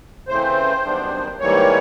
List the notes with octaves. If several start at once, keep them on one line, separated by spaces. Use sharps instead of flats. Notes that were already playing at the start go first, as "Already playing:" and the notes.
C#3 E3 A3 C4 C5
F#2 D#3 G3 B3 D4
G#2 E3 G3 A#3 C#5